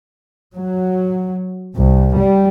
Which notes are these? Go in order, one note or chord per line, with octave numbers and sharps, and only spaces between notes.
F#3
C2
G3